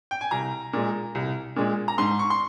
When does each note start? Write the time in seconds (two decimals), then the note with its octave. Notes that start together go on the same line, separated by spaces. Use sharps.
0.11 G5
0.21 G#5
0.31 C2 A#5
0.73 A#2 G#3
1.15 C2
1.56 A#2 G#3
1.88 A#5
1.98 G#2 C6
2.19 C#6
2.30 C6